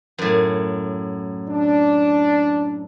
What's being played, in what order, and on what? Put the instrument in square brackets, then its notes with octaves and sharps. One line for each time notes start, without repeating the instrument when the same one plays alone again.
[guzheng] F#2 A2
[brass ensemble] D4